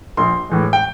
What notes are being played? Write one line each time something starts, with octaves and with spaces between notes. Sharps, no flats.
A#1 C6
A2 E3 G#3
G5